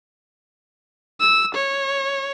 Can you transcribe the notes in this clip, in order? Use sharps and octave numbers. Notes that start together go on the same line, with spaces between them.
E6
C#5